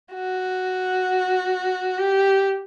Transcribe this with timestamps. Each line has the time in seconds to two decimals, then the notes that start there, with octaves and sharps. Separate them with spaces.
0.14 F#4
1.98 G4